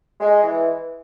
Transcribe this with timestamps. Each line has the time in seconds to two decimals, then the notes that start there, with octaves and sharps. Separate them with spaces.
0.21 G#3
0.43 E3